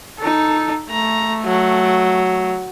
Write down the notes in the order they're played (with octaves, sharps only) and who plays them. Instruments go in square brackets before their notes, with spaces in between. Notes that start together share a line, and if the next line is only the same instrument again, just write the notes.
[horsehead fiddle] D#4 A4
[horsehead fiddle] A3 [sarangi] A#5
[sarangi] F#3